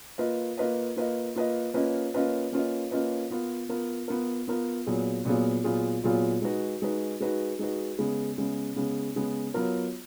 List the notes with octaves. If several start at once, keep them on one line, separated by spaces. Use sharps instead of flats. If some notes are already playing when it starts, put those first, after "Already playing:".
A#3 F4 B4 D#5
A#3 F4 B4 D#5
A#3 F4 B4 D#5
A#3 F4 B4 D#5
A#3 C#4 F4 B4 D#5
A#3 C#4 F4 B4 D#5
A#3 C#4 F4 B4 D#5
A#3 C#4 F4 B4 D#5
B3 F4 A#4
B3 F4 A#4
B3 F4 A#4
B3 F4 A#4
A#2 F#3 B3 F4 G#4
A#2 F#3 B3 F4 G#4
A#2 F#3 B3 F4 G#4
A#2 F#3 B3 F4 G#4
G#3 D#4 F#4 B4
G#3 D#4 F#4 B4
G#3 D#4 F#4 B4
G#3 D#4 F#4 B4
C#3 G#3 B3
C#3 G#3 B3
C#3 G#3 B3
C#3 G#3 B3
F#3 B3 F4 A#4